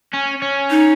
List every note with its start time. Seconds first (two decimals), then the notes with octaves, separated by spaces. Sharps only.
0.13 C#4
0.42 C#4
0.70 D#4